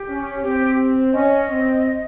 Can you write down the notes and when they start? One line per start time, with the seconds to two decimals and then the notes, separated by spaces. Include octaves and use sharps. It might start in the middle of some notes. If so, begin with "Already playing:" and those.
Already playing: G4
0.08 C#4
0.43 C4 G4
1.13 C#4 D#5
1.49 C4